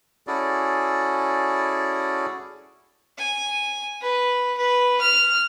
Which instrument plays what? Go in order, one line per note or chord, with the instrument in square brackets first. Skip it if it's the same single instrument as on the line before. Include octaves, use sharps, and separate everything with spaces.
[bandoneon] C#4 E4 F#4 G#4 A4 D5
[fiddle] G#5
B4
B4
F6